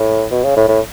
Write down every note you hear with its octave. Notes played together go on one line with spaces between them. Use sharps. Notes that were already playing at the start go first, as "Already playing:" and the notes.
Already playing: A2
B2
C#3
A2
A2